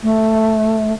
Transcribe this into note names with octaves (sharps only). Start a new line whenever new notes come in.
A3